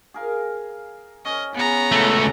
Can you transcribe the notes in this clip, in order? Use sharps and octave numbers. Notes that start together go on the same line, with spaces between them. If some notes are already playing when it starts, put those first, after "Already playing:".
G#4 A#4 F5
C#4 D#5
C#3 B3 G#4 A#5
C#2 A3